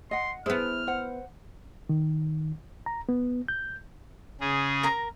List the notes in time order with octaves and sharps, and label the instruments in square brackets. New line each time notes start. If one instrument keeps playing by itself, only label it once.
[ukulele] D#5 F#5 [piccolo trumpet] C6
[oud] B3 E4 [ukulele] G#4 C5 [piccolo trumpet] F6
[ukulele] C5 F#5
[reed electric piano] D#3
A#5
B3
G6
[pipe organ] C#3 G#4
[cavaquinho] A#4 A#5